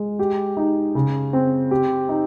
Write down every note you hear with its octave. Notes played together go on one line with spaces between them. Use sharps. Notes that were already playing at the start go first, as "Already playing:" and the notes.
Already playing: G#3
G4
D#4
C#3
C4
G4
D#4